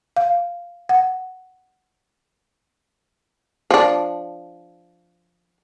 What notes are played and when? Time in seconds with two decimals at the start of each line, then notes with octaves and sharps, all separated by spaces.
0.16 F5
0.89 F#5
3.71 F3 D4